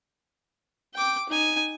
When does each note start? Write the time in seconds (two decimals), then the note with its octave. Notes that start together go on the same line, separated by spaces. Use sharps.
0.95 G5 D6
1.29 D#4 G#5